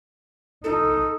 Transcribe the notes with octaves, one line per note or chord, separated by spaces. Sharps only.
D#4 A4